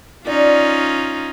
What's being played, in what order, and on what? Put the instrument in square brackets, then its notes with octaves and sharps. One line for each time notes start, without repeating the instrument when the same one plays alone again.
[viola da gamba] C#4 D#4 F4 [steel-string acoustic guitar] D5